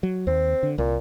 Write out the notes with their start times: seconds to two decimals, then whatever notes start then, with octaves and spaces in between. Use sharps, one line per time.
0.03 F#3
0.27 D#2 C4
0.63 D3
0.78 C2 A#2